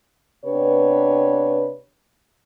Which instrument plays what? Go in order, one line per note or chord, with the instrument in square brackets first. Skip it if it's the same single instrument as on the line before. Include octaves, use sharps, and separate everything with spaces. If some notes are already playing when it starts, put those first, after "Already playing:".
[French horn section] C3 B3 D4 G4 B4 C#5